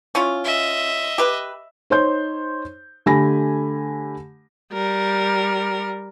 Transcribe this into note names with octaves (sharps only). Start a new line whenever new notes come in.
C#4 E4 F4
D#5 E5
G4 B4
D#4 C5 C#5 C6 G6
D3 A3 G4 G#5 B5 A#6
G3 A#4